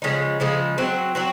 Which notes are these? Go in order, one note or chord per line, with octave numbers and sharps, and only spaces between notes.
C#3 F3 G#3 D#4
C#3 F3 G#3 D#4
F#3 C4 F#4
F#3 C4 F#4